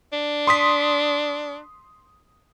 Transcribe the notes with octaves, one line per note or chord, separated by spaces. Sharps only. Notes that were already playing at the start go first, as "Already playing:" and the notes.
D4
C6 D#6 B6